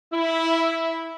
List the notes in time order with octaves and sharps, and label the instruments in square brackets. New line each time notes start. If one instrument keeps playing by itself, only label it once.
[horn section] E4